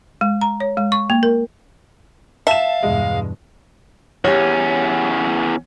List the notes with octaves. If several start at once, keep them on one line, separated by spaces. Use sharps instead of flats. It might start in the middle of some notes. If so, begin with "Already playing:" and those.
G#3
A#5
C#5
G#3
C#6
A#3
A#4
E5 F5 A5 E7
E2 G2 B2 G#3
E2 C#4 G4 C#5